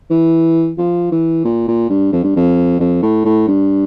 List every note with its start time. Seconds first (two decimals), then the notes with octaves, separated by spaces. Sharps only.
0.10 E3
0.78 F3
1.12 E3
1.45 A#2
1.68 A#2
1.89 G2
2.12 F2
2.23 G2
2.36 F2
2.80 F2
3.02 A2
3.25 A2
3.47 G2